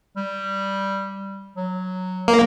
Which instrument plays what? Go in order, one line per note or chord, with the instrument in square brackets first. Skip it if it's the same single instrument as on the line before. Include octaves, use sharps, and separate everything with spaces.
[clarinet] G3
F#3
[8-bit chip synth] A#3